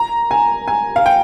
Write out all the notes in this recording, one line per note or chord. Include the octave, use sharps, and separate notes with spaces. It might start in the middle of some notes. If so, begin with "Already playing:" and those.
Already playing: A#5
G#5
G#5
F5
G5